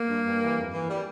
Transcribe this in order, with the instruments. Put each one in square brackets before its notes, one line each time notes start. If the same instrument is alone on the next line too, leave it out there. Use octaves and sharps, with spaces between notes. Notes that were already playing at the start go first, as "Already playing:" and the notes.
Already playing: [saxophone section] A#3
G2
G2
E3
F2
E3
G3